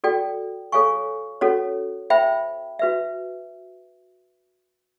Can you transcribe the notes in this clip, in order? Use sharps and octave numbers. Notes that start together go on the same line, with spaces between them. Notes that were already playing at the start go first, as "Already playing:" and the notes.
F#4 A4 D5 G5
A4 C#5 F5 G#5 C#6
C#4 F#4 A4 C#5
C5 E5 G5 B5
F#4 B4 E5